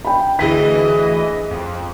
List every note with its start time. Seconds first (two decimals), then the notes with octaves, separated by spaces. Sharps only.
0.05 G5 B5
0.39 D2 E3 G#4 D#5 B6
1.50 F2